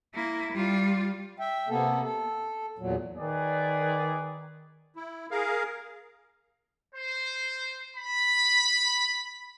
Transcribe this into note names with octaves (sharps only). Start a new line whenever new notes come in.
A#3 E4
G3 F4
E5 G5
C3 A#3 B3 A4
A4
E2 A#2 F#3
D#3 G#4 B4 D5
E4
G#4 A#4 F5
C5
B5